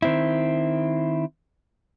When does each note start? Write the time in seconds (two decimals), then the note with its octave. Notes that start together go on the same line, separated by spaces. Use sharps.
0.02 D#3 C4 E4